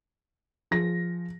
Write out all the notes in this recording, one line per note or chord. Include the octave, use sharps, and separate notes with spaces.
F3 G#4 A#6